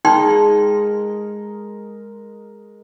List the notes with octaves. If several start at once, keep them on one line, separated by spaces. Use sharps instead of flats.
G#3 D#4 A#4 D#5 G5 C6